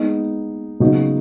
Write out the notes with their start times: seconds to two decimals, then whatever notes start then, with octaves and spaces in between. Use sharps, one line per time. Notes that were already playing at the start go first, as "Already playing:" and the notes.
Already playing: G#3 B3 D#4
0.80 C#3 F#3 B3 D#4 F#4